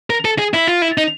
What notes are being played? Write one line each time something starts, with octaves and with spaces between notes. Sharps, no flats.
A#4
A4
G#4
E4
F4
E4
D#4